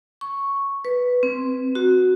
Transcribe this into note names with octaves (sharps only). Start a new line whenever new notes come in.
C#6
B4
C4
F#4